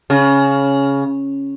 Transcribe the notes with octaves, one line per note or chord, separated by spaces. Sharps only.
C#3